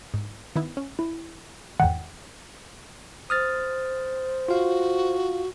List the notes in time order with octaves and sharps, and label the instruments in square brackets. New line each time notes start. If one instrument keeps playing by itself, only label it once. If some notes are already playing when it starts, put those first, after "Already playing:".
[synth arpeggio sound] G#2
D#3 B3 E4
C#4
[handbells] E4
[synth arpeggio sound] E2 G#2 D#3 [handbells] F#5 G5
[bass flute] C5 [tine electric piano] D#6 F6 A6
[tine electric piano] F4 F5 [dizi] F#4